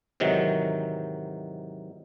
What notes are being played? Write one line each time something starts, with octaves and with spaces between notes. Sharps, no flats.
G#2 C3 D#3 E3 F#3